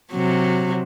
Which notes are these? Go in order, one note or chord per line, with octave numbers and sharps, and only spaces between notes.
C3 F#3